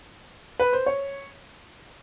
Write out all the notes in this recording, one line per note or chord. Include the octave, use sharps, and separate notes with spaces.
B4
C5
C#5